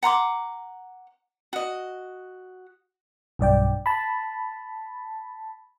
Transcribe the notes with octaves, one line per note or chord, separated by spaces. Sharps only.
F#5 A#5 C6 D6
F#4 D#5
B1 G2 D5 G5
A5 B5